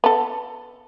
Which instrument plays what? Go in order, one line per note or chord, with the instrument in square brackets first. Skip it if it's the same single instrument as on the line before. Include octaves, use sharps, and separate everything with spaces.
[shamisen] B3 A4